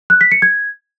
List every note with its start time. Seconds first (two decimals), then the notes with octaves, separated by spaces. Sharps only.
0.10 F#6
0.21 B6
0.32 C#7
0.42 G#6